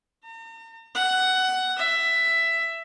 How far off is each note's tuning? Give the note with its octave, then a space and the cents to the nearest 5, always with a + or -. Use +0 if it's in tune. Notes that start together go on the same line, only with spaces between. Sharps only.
A#5 -45
F#5 +15
E5 +10